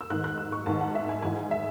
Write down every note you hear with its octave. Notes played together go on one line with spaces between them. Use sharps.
E6
G#2 D#3 F#6
F#6
E6
C#6
G#2 D#3 A5
F#5
E5
G#5
G#2 E3 G#5
E5